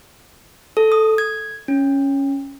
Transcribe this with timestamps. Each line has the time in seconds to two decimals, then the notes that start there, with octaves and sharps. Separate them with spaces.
0.77 A4
0.92 D#6
1.18 G#6
1.68 C#4